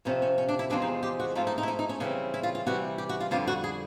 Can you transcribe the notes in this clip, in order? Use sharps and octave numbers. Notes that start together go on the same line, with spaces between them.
F2 C3 F3 C#4
C#4
C#4
D4
E4
E2 C3 F3 G#3 C4 D4
D#4
G4
F#4
G#2 F3 A3 C4 F4
D#4
D#4
E4
D#4
D#4
C#4
C#3 E3 G3 C4 D4
E4
F4
F4
C3 E3 G3 F#4
G4
F#4
F4
F2 D3 G3 F4
F#4
G#4